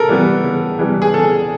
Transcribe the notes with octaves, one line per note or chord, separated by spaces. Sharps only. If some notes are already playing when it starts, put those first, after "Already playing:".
Already playing: C#3 A4 A#4
E3 G3 B3
C#3
E3 G3 B3
G#4
C#3 A4